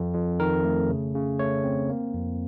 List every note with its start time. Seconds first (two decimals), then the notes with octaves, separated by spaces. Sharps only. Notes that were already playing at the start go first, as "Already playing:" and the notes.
Already playing: F2 C4
0.14 F2
0.40 D#3 A#4
0.65 A3
0.90 C#3
1.15 C#3
1.39 A3 C#5
1.64 C4
1.89 A#3
2.14 F2